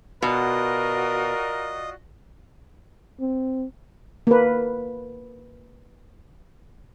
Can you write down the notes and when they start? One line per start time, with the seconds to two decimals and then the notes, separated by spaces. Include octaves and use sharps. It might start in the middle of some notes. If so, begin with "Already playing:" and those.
0.22 B2 F4 F#4 A#4 D5 D#5
3.20 C4
4.27 A#3 B4